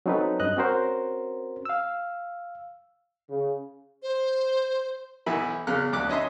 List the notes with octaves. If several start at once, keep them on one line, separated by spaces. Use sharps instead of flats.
F#3 C4 C#4 D#4 A4 B4
G2 D#5 F#6
C4 C#4 F#4 A#4 C5
F5 E6
C#3
C5
B1 E3 E4 B5
E2 C#3 F5 F6 F#6
D2 D6 F#6
C#4 D#5 E5 C6